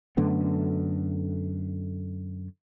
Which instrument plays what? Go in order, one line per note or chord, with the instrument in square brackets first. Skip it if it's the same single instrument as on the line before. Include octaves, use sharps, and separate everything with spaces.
[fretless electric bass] F#2 D3 A3 B3